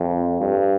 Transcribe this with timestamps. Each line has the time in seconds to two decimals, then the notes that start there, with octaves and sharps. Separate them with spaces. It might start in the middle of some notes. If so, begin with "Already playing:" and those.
Already playing: F2
0.40 G2